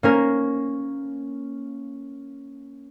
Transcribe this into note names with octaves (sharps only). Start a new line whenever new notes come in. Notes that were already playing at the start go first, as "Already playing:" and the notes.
A#3 C#4 A#4